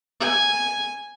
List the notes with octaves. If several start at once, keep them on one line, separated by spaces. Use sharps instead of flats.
G#5